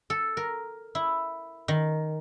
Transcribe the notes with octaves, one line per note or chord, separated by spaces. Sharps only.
A4
A#4
E4
D#3